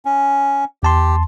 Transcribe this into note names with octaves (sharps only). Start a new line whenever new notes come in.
C#4
E2 G4 A5 C6